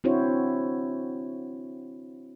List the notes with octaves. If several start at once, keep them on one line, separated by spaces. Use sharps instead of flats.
C4 D4 E4 F#4 C5 C#5